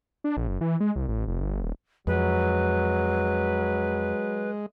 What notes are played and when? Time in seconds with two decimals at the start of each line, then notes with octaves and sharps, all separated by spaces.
0.24 D4
0.37 A#1
0.48 F#1
0.61 E3
0.80 G#3
0.96 C2
1.08 A1
1.28 F1
1.41 G1
1.62 D#1
2.07 F2 F#3 G#3 B4